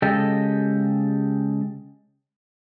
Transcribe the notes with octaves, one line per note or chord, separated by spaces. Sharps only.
C#3 G#3 G4 A4 D#5